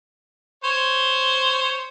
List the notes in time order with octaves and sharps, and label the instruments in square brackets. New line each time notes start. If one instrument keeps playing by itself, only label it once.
[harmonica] C5 C#5